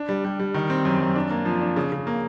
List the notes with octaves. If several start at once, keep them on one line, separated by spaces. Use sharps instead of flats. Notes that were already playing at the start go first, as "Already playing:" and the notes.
Already playing: D4
G3
G3
G3
D#3
C4
F#2
F#2
D4
A#3
F3
D4
C#3
C#3
A#3